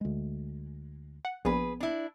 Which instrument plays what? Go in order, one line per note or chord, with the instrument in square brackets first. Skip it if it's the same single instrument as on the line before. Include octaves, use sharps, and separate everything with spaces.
[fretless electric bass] D2 G#3
[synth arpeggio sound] F#5
[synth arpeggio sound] A#1 [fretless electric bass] B3 [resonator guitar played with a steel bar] G#4 B4
[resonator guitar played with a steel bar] D4 E4